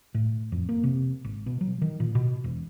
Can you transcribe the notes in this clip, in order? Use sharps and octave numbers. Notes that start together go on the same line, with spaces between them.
A2
F2
A#3
C3
G#1
B2
F#3
D#3
A#2
B2
E1